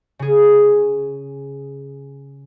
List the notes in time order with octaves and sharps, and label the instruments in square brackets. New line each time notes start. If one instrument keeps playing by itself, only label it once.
[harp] C#3 G#4